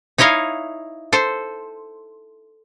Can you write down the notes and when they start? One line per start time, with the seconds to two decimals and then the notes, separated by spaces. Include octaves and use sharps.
0.18 D#4 E4 C#5 D#5 F5
1.13 A4 C5